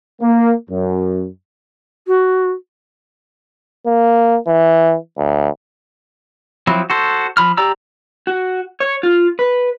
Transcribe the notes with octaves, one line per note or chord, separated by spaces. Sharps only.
A#3
F#2
F#4
A#3
E3
D2
F3 F#3 C4 E4
F#4 A4 C5
F3 B5 F6
G4 D5 A#5 E6
F#4
C#5
F4
B4